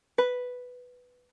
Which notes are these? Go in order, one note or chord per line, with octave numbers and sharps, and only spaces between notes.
B4